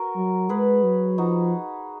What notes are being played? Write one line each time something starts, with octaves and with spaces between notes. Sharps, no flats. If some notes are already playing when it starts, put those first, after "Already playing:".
Already playing: F#4 A#4
F#3
G#3 G#4 B4
F#3
F3 D#4 F#4